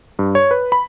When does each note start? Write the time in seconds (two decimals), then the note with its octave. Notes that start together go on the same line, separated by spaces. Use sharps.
0.19 G2
0.35 C#5
0.51 B4
0.72 B5